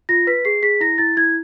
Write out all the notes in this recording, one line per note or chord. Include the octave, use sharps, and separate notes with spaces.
F4 A#6
B4 B6
G#4 C7
G#4 B6
E4 A#6
E4 A6
E4 G#6